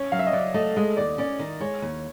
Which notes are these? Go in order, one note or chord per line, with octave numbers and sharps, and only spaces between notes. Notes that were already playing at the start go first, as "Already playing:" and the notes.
Already playing: C#4 C#5
F#3 F5
E5
D#5
F#3 D5
A3 D#5
G#3 D#5
D#2 D5
C#4 D5
D#3
G#3 C#5
D#2